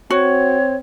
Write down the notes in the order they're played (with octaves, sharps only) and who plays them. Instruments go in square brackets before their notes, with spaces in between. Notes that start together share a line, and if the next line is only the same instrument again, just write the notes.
[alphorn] C4 [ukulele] F#4 [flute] C#5